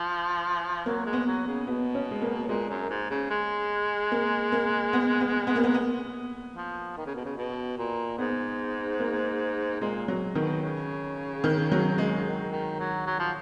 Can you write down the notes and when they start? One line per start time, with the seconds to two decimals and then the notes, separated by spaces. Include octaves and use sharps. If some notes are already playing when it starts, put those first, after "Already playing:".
Already playing: F3
0.86 F#3 A#3
1.06 G#3
1.13 B3
1.27 F#3
1.47 C#3
1.67 B2 B3
1.95 C#4
2.11 G#3
2.22 A#3
2.48 A#2 G#3
2.69 F#2
2.89 G#2
3.10 C#3
3.30 G#3
4.12 A#3
4.52 A#3
4.93 B3
5.21 B3
5.47 B3
5.56 A#3
5.64 B3
5.74 B3
6.56 F3
6.97 D#3
7.06 C#3
7.15 B2
7.25 C#3
7.37 B2
7.78 A#2
8.18 G#2 B3
9.00 A#3
9.81 A#2 G#3
10.08 F#3
10.35 B2 D#3
10.62 C#3
11.44 D#3
11.72 F#3
11.98 G#3
12.26 D#3
12.52 D#3
12.80 F#3
13.06 F#3
13.19 F3